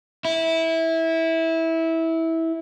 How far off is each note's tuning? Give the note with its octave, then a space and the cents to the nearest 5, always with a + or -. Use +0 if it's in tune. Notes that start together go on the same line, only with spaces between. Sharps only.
E4 -15